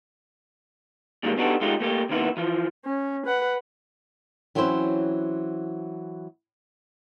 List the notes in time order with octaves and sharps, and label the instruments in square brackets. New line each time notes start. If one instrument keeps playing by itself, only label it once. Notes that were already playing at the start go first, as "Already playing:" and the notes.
[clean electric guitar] A#2 D#3 G3 G#3 A#3
B3 D4 D#4 F#4 G4 A4
G#3 A3 D#4 F4 G4
A3 A#3 G4
C3 D#3 A#3 B3 E4
E3 F3
[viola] C#4
B4 F#5
[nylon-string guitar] E3 F#3 C4 C#4 E4 C5